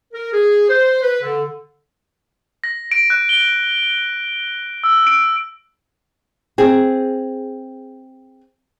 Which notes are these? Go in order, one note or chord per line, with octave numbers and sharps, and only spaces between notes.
A#4
G#4
C5
B4
D3
A#6
D7
F#6
G7
E6
D7
C4 G#4